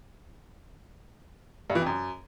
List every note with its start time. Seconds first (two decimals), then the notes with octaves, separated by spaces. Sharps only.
1.70 G2
1.75 E3
1.81 F2
1.86 F#2